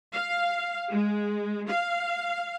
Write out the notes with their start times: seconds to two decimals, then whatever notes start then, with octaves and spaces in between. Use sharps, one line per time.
0.13 F5
0.90 G#3
1.69 F5